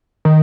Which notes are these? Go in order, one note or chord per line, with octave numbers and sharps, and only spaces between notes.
D#3